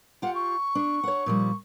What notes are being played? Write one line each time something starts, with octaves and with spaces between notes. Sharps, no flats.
F4 G4 F#5
C#6
D4
C#5 F#5
A#2 F3 G3